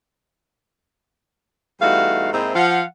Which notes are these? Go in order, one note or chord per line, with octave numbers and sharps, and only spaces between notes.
E2 G3 A3 D#4 F#4 F5
G#2 A#3 C4 D#4 E4
F3 F5 F#5